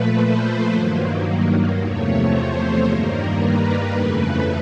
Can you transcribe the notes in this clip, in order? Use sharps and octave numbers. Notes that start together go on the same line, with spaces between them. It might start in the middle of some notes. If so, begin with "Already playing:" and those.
Already playing: A#2 F3 A3 B4
C5
G2 D#3 F#3 A#3
E2 C3 F3 A3 C#5
C5
G2 D#3 G3 A#3 A#4
B4
F2 C#3 E3 A3 B4